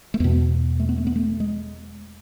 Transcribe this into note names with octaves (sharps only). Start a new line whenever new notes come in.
A3
E2 B2 B3
A3
B3
A3
B3
A3
G#3